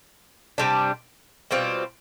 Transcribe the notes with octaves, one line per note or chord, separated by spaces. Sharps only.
C3 G3 D4
B2 G3 C4 F4